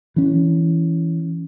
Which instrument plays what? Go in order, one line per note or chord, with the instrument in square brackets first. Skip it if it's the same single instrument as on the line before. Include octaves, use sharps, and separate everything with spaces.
[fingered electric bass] E3 C#4